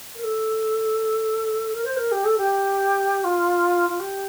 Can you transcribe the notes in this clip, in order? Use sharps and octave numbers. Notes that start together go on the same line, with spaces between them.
A#4
A4
A#4
C5
A#4
G4
A4
G4
F4
F4
G4